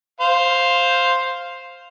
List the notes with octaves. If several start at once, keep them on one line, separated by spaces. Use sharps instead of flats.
C5 F5